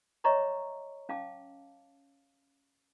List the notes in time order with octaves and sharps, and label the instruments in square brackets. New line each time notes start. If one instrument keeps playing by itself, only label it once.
[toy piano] C#5 D#5 E5 A#5 C#6 D6
C#4 F5 A5 D6